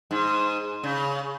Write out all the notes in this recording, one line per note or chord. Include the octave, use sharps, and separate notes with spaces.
G#2
C#3